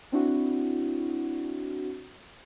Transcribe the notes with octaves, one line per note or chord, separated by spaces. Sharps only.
C4 D4 E4 F#4